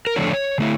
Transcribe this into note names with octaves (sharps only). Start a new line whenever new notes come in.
A#4
D3 F3 A3 D4 C#5
D3 A3 E4